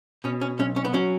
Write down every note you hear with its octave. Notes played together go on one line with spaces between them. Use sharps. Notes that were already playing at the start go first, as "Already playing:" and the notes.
B2 C#4
C#4
B1 C#4
C#4
B3
F#3 C#4